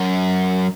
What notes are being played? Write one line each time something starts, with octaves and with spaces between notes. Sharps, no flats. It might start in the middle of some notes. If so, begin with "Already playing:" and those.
Already playing: F#2